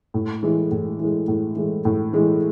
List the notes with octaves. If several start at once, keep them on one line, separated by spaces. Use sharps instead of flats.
A2
E3 G#3
A2
E3
G#3
A2
E3 G#3
A2
E3 G#3